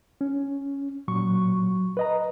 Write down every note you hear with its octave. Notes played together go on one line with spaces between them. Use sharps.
C#4
A#2 F#3 C#6
B4 D#5 A#5